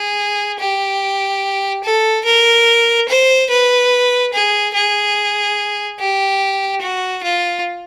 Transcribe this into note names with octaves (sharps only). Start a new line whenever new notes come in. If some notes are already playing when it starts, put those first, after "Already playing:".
Already playing: G#4
G4
A4
A#4
C5
B4
G#4
G#4
G4
F#4
F4